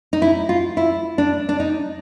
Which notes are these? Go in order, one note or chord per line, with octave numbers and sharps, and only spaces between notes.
D#4
E4
F4
E4
D4
D4
D#4